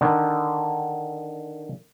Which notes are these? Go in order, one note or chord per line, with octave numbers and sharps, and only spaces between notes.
D3 D#3